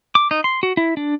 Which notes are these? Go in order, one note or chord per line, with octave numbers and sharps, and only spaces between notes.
D6
D#4
C6
F#4
E4
D4